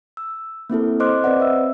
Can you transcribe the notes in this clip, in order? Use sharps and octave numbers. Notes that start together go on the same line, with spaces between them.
E6
A#3 C4 E4 A4
C5 D#5 C6 D6 F6 F#6
C4 B4 C5 D5 D#5 F#5
E5 E6